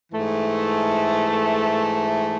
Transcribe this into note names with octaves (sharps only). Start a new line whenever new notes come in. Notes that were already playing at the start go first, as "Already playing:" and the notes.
G#2 E3 A3